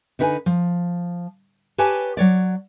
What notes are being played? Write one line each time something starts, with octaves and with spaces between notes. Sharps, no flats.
D3 D#4 B4 G5 G#5
F3
G4 B4 C#5 G#5 A5
F#3 C#5 D5